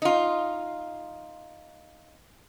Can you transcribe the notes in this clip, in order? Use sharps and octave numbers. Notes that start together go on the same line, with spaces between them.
D#4 F4